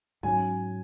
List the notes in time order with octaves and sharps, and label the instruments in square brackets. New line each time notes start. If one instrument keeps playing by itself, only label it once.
[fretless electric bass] G#2 F#3 C#4 [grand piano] G#5